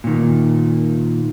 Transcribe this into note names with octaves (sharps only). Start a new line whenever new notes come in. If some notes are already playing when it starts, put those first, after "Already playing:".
A#2 D#3